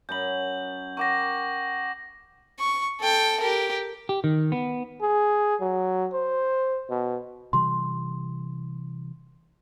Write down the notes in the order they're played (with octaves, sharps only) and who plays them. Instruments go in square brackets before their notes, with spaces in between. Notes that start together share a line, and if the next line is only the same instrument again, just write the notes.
[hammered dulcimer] F#2 A#5 B5 [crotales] G6 F#7
[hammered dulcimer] A#4 F#5 G5 [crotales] C#6 D6 A#6
[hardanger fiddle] C#6
A4 G5
G4 A#4
[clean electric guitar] G4
D#3
B3
[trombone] G#4
F#3
C5
B2
[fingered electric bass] C3 E3 G3 [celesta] C6